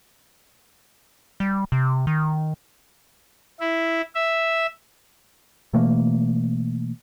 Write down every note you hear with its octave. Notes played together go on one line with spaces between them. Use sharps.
G3
C3
D#3
E4
E5
B2 E3 A3 A#3